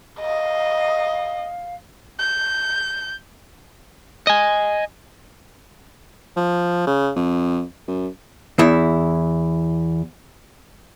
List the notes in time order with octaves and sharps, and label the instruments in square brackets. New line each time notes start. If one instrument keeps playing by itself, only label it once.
[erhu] D#5 [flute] F5
[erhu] G6
[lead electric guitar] D#5 G#5
[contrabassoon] F3
C#3
F2
F#2
[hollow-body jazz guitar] E2 E4